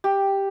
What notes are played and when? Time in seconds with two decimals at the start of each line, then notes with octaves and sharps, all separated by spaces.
0.04 G4